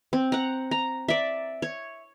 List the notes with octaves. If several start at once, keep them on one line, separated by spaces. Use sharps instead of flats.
C4
F#5 A#5
A#5
D5 E5
C#5